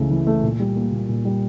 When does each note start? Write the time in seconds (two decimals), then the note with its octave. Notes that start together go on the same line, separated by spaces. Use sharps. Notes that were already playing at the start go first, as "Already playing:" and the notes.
Already playing: C#2 C#3 E3 A3
0.11 E3
0.27 A3
0.43 A#2
0.60 G3
0.76 A#3
0.92 A#2
1.09 A#2
1.25 G3